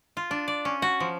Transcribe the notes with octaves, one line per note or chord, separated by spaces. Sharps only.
F4
D4
D5
C#4
F#4
F3